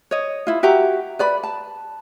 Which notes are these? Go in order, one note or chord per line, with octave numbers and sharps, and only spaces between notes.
C#5 D#5
E4 F4
F#4 G4 E5 A#5
B4 D5 B5
A5